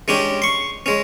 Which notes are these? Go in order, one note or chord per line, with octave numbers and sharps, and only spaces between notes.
G#3 C#4 D4 G4
C6 C#6
G#3 C#4